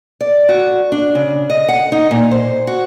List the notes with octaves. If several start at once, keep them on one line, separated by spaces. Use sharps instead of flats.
D5
F#4
D4
C#3
D#5
F#5
D#4
A#2
C5
F#4